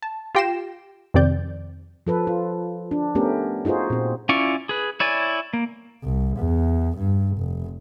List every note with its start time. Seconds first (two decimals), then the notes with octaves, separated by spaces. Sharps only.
0.02 A5
0.35 F4 G4 G5 A#6 C7 E7
1.14 F2 C3 D#3 C4 D5 G6
2.07 F3 A4 B4
2.27 F4
2.91 D4
3.15 A3 B3 C#4 G4 A#4
3.65 D#4 F4 F#4 G#4 C5
3.90 A#2 C4
4.29 C#4 E4 F4 D5 C#6
4.69 G#4 B4
5.00 E4 C#5 D5 G#5
5.53 A#3
6.03 C2
6.38 E2
6.98 G2
7.38 F1